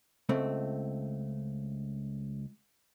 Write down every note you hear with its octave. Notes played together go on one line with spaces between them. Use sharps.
C#2 A3 C4